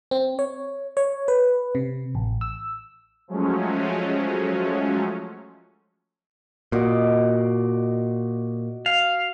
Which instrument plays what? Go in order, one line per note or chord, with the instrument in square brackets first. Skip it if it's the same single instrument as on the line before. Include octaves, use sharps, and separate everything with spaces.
[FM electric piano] C4
C#5
C#5
B4
C3
A1
E6
[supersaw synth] F3 F#3 G#3 A3 C#4
[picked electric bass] A#2 [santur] F#4 D5 D#5
[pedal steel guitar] F5